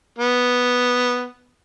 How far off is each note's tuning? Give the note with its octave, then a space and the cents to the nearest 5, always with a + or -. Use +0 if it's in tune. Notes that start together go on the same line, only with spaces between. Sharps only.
B3 +0